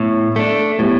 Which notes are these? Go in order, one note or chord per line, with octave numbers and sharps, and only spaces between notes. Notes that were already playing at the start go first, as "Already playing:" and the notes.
Already playing: A2 B3
A3 D4
A2 G3 B3